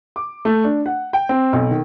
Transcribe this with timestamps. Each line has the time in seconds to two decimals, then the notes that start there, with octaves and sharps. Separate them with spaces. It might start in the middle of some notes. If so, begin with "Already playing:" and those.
0.16 D6
0.45 A3
0.64 D4
0.86 F#5
1.13 G5
1.29 C4
1.53 B1
1.71 D#3